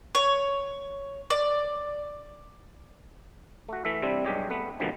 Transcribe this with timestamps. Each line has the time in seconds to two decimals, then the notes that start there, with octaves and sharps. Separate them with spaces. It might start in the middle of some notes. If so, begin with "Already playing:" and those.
0.15 C#5
1.30 D5
3.69 A3 F#4
3.85 E3 A3 E5
4.02 C3 G3 C4 D4 E4
4.25 B1 G2 G#3 G4 C#5 D#5
4.50 A3 B3 B4
4.80 A#1 B2 D3 D#3 F3 G3